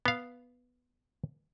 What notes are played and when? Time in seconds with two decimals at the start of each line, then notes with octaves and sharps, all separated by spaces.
0.06 B3 F5